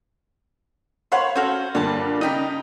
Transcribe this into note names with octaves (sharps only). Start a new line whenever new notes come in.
C5 C#5 F5 F#5 B5 C6
C#4 F#4 A4 C5 F6
G2 A#2 D3 C#5 A5
C#3 D#4 D#5 G5 B5